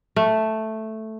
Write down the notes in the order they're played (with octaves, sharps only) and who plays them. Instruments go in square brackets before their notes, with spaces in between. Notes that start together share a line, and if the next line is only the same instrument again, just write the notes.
[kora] A3